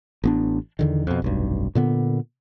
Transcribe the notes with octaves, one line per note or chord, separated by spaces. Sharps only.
A1 B3 D4
E2 D3 D#3
F2 B2
F1 B1 G2
A#2 D3 B3